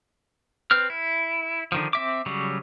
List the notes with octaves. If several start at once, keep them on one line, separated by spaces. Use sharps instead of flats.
C4 B4 F6
E4
D3 D#3 F3
C4 E5 D6
C#3 F#3 G3